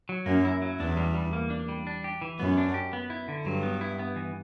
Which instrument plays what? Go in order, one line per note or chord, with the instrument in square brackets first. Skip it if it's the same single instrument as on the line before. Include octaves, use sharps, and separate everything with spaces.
[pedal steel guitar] F#3
[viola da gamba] F#2 [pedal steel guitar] A#3
[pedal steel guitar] E4
F#3
[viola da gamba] E2 [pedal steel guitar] D4
[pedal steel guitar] G3
G3
A#3
D4
G3
D4
G4
E3
[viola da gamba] F#2 [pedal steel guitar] B3
[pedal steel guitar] D4
G4
B3
E4
D3
[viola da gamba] G2 [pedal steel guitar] F#3
[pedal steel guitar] B3
E4
B3
E3